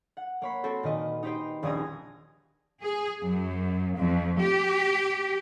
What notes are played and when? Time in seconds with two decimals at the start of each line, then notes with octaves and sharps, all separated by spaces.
0.17 F#5
0.42 A#3 C#5 B5
0.64 C4 F#4 A4 C5
0.83 A#2 D#3 B4 D#5
1.23 D#4 G4 B4 C5 G5
1.63 D#1 A#1 D#4 D#6 G#6 A#6
2.84 G#4
3.22 F#2
3.97 F2
4.40 G4